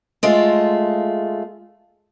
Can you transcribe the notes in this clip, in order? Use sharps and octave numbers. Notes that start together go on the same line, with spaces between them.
G#3 A3 F4